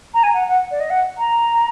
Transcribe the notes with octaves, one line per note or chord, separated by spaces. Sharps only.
A#5
G#5
F#5
F#5
D5
D#5
F#5
A#5